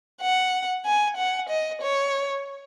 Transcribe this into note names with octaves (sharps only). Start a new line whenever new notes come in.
F#5
G#5
F#5
D#5
C#5